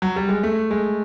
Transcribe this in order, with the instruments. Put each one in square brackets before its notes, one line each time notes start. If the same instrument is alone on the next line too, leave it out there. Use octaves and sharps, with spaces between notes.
[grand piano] F#3
G3
G#3
A3
G#3